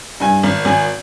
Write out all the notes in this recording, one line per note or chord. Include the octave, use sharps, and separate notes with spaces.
G2 G#5
G#1
G#1 G#5